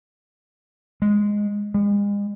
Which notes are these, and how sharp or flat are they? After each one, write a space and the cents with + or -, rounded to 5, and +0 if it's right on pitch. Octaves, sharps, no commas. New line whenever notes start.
G#3 -5
G#3 -40